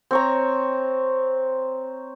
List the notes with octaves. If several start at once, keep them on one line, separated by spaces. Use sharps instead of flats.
C4 C#5 A#5